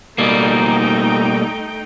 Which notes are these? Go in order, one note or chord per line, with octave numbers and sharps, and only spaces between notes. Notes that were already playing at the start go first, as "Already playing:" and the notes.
B2 G3 A3 A#3 D#4 G5